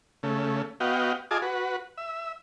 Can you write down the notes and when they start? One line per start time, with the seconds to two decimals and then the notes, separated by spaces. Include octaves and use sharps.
0.23 C#3 A3
0.80 B3 F#4 D#5 F5 G5
1.31 F4 G#4 D#5 G#5 A5 D6
1.42 F#4 B4
1.97 E5